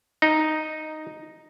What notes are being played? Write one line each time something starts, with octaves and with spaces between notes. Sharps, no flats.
D#4